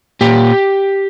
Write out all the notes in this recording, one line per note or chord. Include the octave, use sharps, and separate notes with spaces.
A#2 G4